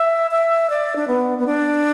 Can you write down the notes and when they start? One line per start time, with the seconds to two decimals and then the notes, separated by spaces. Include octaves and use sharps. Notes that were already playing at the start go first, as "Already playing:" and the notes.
Already playing: E5
0.31 E5
0.70 D5
0.96 D4
1.08 B3
1.38 B3
1.46 D4